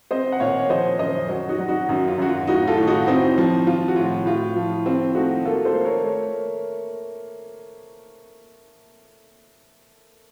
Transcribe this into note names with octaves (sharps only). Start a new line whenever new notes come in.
C4 C5 D#5
F#5
A#2 C#5 F5
F3 C5 D#5
F#2 C5 D#5
F#3
D#4 F#4
F#3
D#4 F#4
F#2 D#4
F4
F#2 F#4
F4
A2 D#4 F#4
F4 A4
A2
D#4 F#4
C4 D#4
F3
F3 F4
F#4
A2 F4
A2 F4
F3
C4 F4
A3 D#4 F#4
A#3 F4 A4
A4 C5
A#3
A#4 C#5
A3